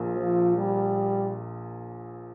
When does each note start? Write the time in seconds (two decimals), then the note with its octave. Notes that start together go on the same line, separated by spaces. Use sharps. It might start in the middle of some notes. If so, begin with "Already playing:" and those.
Already playing: A#1 A#2 A#3
0.16 F3
0.57 G3